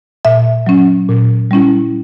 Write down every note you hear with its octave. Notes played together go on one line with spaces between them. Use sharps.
A#2 E5
F#3 C#4
A#2
G3 C#4 E4